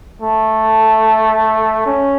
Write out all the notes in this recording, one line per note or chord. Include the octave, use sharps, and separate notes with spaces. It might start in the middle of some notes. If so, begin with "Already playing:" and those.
A3
C#4